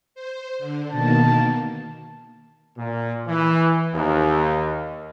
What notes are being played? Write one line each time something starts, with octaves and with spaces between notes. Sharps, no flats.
C5
D3
B2 D#3 A#3 A5
A#2
E3
D#2